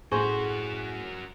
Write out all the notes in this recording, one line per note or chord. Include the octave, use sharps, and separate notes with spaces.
A2 A3 F#4 G#4 A#4 C5 C#6